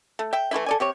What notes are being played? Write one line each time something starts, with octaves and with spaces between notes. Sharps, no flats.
A3
E5 G5
E3 A3 E4 E5
A4 D5 G#5
C3 G4 C#5